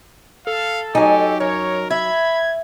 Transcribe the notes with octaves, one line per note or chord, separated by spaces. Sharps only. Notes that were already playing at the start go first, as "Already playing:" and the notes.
A4 F5
F#3 D#4 G4 G#5
F#2 A#4 C#5
E5 B5 G#6